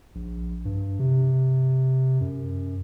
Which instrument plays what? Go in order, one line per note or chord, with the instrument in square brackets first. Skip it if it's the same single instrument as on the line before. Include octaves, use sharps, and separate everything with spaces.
[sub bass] A#1
G2
C3
F#2